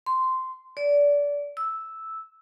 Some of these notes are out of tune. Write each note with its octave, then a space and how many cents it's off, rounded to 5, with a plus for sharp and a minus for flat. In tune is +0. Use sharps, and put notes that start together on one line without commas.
C6 -10
D5 -25
E6 -5